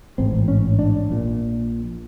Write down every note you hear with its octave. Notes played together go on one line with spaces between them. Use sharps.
A1 G#2 C4
C#4
D4
A#1 A#2